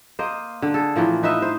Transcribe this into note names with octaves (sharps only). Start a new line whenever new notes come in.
A#3 C5 D#5
D3
G#4 A4
A2 E3 F3 A#3
D#4 B4 D#5 E5
D#4 C5